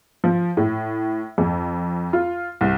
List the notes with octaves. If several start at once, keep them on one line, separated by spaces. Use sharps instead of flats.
F3
A2
F2
F4
C2